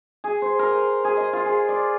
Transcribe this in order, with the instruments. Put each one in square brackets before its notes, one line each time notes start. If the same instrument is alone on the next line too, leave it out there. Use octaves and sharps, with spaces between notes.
[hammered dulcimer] G#4
C5
A#4
G5
G#4
D#5
F4
G#4
D5